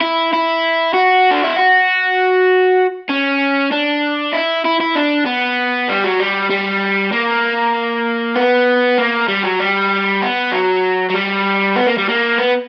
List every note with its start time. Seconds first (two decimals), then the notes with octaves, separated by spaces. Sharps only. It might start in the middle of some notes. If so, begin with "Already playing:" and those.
0.01 E4
0.33 E4
0.94 F#4
1.31 D4
1.44 E4
1.56 F#4
3.10 C#4
3.72 D4
4.34 E4
4.65 E4
4.80 E4
4.95 D4
5.26 B3
5.89 G3
6.04 F#3
6.20 G3
6.50 G3
7.12 A#3
8.36 B3
8.98 A#3
9.28 G3
9.44 F#3
9.60 G3
10.22 B3
10.52 F#3
11.10 F#3
11.14 G3
11.76 B3
11.87 A#3
11.98 G3
12.09 A#3
12.38 B3